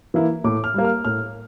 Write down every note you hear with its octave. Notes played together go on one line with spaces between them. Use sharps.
E3 A#3 E4
A2 D6
F6
G3 A#3
F6
A2 F6